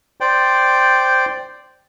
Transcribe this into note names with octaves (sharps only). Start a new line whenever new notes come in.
C5 D5 G5